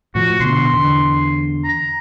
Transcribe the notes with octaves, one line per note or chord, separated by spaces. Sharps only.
A2 F3 F#4
B2 D3 C6
E2 D3
A#5